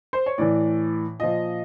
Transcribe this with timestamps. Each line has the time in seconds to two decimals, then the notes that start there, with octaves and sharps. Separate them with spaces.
0.13 C5
0.26 C#5
0.38 A2 E3 D5
1.20 A#2 F3 D#5